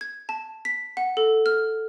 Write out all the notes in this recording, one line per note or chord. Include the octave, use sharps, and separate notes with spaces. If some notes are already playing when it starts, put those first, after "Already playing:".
G#6
A5
B6
F#5
A4
F6